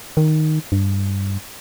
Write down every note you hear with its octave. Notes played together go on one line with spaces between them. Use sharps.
D#3
G2